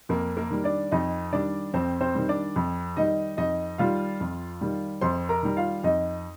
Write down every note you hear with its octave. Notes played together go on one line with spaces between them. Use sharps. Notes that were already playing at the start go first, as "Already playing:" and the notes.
F2 A#3 A#4
A#3 A#4
D#3 G3
D4 D5
F2 D#4 D#5
D#3 G3 D4 D5
F2 C4 C5
C4 C5
D#3 G3
D4 D5
F2
D#3 G3 D#4 D#5
F2 D#4 D#5
D#3 G3 F4 F5
F2
D#3 G3
F2 C5 C6
A#4 A#5
D#3 G3
F4 F5
F2 D#4 D#5